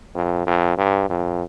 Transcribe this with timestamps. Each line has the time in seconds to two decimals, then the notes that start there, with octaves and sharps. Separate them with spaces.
0.15 F2
0.47 F2
0.78 G2
1.10 F2